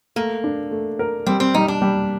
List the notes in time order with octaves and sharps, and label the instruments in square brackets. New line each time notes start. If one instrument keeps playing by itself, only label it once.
[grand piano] A3 [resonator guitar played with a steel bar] A#3
[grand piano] D4
A3
A#4
[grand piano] G3 [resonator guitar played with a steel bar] C4
[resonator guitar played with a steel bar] C4
[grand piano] G3 [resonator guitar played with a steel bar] D#4
[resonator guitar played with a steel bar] D4
[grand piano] G3